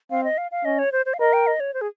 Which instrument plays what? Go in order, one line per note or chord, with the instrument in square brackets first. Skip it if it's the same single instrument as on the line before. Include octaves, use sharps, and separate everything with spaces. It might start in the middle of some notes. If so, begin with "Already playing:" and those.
[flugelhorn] C4 [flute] F5
[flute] D#5
F5
F5
[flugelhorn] C#4 [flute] D#5
[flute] C#5
C5
C5
F5
[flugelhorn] A#4 [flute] D#5
[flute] G5
D#5
C#5
C5
G#4